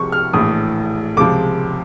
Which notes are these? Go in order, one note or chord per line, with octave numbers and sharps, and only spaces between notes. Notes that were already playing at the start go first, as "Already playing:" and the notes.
Already playing: C2 C3 F3 G#3 C#6
F6
A#1 A2 E3 D#6
C#2 C3 F3 G#3 D6